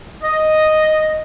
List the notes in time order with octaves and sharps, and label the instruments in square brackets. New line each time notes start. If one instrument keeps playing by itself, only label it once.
[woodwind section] D#5